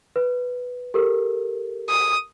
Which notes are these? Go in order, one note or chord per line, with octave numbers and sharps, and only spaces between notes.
B4
G4 A4 A#4
D#6